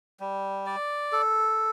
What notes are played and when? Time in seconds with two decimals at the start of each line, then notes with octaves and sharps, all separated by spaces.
0.20 G3
0.66 D5
1.12 A4